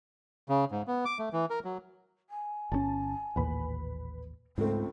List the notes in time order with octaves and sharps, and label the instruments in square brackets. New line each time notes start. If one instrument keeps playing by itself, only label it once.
[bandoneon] C#3
G#2
B3
D6
A3
E3
A#4
F#3
[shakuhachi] G#5
[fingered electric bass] G1 B2 C#4 [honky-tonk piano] A5
[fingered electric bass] A1 D#2 A#2 [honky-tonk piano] B4 B5
[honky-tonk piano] C#2 A3 [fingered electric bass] G#2 [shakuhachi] C4